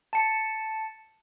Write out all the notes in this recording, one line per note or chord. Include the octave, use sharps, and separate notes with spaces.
A5 C#7